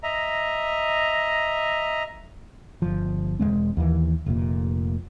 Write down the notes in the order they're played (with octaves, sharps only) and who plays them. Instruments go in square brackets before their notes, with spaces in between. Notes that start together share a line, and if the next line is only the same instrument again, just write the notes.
[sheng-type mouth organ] D#5 E5 A#5
[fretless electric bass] G1 F3
E1 G#2 G#3 C4
D#2 E3
F1 A#2